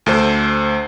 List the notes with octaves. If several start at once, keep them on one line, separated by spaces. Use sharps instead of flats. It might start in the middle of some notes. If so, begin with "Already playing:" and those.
D2 A4 C5